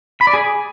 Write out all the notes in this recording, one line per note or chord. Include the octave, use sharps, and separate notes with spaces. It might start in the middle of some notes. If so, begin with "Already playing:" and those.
B5
D5
G#4